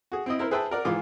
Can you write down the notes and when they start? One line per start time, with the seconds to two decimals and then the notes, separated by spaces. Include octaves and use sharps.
0.12 F#4 G#4
0.26 C4 E4 D#5
0.39 E4 A#4 C5
0.51 G#4 B4 C5 E5 G5 A5
0.71 A#4 D5 F#5
0.85 G#2 D#3 E3 F4 G#4 D6